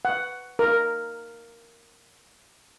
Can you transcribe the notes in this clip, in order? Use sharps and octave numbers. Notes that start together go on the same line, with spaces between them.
F#5
A#4